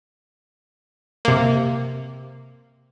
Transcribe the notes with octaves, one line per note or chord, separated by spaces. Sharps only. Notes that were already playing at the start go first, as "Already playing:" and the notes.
C3 A#3